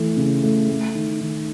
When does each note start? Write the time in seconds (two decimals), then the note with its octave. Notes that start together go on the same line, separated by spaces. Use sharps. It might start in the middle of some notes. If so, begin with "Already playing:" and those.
Already playing: E3 A3
0.17 C#3
0.43 A3
0.69 A3
0.95 D#3
1.21 D#3